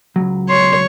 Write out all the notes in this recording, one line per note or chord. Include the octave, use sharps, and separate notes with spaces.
C#2 F#3
C#5 C6